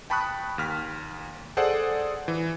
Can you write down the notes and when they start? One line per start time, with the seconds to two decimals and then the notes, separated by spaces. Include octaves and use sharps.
0.10 G5 A5 B5 C#6 D#6 F#6
0.58 D#2 F6 B6
1.57 G#4 A4 C5 D5 F#5
2.28 E3